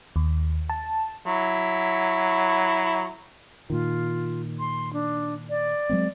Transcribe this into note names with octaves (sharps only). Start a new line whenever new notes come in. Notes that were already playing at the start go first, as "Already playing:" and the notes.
D#2
A5
F#3 E4
A#2 D#3 F4
C6
D4
D5
F#3 G#3 C4